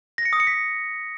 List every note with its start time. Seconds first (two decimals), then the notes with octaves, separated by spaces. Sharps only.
0.18 A#6
0.25 C#7
0.33 D#6
0.40 C#7
0.47 B6